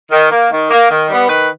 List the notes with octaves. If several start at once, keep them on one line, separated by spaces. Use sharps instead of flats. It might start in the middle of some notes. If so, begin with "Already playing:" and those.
D#3
A#3
D#3
A#3
D#3
G3 B3
D#3 B4